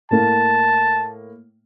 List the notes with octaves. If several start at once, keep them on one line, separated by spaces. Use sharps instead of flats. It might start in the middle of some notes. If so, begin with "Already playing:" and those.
A2 A#3 A5